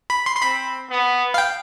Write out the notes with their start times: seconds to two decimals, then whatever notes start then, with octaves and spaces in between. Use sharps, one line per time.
0.10 B5
0.26 C6
0.36 C6
0.42 C4 B5
0.90 B3
1.34 F5
1.38 G5